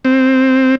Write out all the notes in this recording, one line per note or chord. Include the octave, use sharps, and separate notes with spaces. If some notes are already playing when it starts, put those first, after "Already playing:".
C4